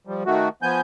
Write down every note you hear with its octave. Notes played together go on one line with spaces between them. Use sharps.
F3 G3
D#3 A3 F#4
F3 B3 G#5 G6